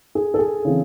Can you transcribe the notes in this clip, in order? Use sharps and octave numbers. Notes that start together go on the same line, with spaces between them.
G#4
A4
G#4
C#3 E3 C4